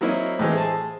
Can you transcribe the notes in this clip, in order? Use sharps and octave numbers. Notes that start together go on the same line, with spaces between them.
F#3 A#3 C4 E4 C#5 D#5
A2 E3 G#3 C4
G#4 C5 A5